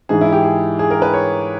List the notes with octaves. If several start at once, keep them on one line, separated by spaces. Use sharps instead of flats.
G#2 E3 G#4
E4
G4
G#4
G#4
A#4
B4
C#5